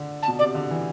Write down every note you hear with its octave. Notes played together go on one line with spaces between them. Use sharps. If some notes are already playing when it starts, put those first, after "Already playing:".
Already playing: D3
A5
B2
C3 D5
D3
E3